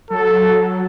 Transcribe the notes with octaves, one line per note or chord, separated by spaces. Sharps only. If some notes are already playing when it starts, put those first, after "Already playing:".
F#3 A4